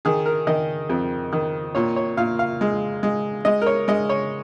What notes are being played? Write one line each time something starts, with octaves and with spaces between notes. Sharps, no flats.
D#3 G#4
A#4
D#3 D#5
F2
D#3
A#2 C#5
C#5
A#2 F5
F5
G#3
G#3
G#3 D#5
A#4
C#5
G#3 D#5
C#5